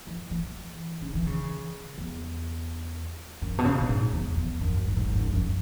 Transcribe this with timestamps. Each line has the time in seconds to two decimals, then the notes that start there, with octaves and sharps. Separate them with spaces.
0.07 E3
0.31 E3
1.01 C#3
1.15 E3
1.27 C#3
1.98 E2
3.42 F#2
3.58 B2
3.65 C#3
3.81 B2
3.89 G#2
4.13 E2
4.36 E2
4.61 F#2
4.85 G#2
4.96 G#2
5.08 G#2
5.21 F#2
5.33 F#2